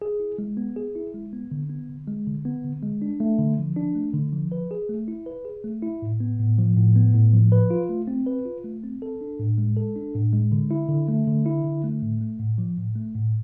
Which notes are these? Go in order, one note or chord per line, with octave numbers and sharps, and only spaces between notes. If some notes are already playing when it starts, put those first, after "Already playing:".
G#4
E4
G#3
B3
G#4
E4
G#3
B3
D3
B3
D3
G#3
D3
B3
D3
G#3
D4
A3
D3
F3
D4
A3
D3
F3
B4
G#4
A3
E4
B4
G#4
A3
E4
A2
B3
A2
F3
A2
B3
A2
F3
B4
F4
A3
C4
B4
F4
A3
C4
A4
D4
A2
G#3
A4
D4
A2
G#3
D3
E4
D3
A3
D3
E4
D3
A3
A2
A3
A2
F3
A2
A3
A2